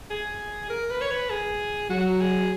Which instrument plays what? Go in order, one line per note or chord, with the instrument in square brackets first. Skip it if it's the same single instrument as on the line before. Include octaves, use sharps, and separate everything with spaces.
[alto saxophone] G#4
A#4
B4
C#5
B4
G#4
[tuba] F#3 [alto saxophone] F#4
[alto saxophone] G#4